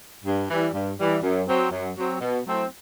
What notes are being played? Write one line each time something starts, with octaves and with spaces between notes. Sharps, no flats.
G2
E3 G3
G2
E3 G3
F#2
F#3 C4
F#2
F#3 C4
B2
F#3 A3 C4 E4